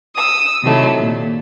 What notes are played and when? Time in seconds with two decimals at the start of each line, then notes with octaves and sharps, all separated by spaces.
0.14 D#6 E6
0.63 C3 D#3 F#3 A3 E4
0.98 A#2